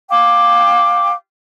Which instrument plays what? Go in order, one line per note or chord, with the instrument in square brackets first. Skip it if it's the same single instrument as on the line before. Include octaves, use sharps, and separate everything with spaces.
[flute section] F5 G5 D6